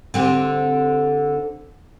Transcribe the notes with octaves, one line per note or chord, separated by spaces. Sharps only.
D3 C4 G4